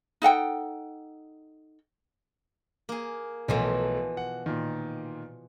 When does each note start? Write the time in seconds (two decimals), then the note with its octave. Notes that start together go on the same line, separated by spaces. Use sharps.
0.22 D#4 A4 F#5 G5
2.89 A#3 G#4
3.48 B1 B2 E3 F3 A3
4.17 F#5
4.46 A#2 D#3